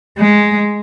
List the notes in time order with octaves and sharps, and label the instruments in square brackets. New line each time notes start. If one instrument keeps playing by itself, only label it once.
[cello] G#3